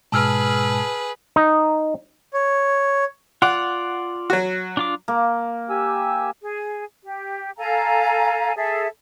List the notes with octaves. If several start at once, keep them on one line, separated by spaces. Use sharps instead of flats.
G#2 B2 G#3 G#4 B4 A5 E6 F6
D#4
C#5
F4 D5 F#5
F#3 F#4
D4 F4 D6
A#3
G4 G#5 E6
G#4
G4
A4 F5 G#5 A#5
G#4 A4 E5